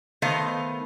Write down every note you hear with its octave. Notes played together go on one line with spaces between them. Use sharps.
D#3 A3 B3 C5 F5